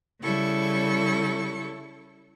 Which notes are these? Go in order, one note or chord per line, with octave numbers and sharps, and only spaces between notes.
C#3 G3 E4 A4 C#6